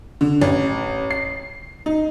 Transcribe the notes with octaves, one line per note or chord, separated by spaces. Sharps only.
D3
A1
C7
D#4